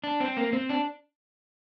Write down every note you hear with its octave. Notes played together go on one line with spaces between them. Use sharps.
D4
C4
A#3
C4
D4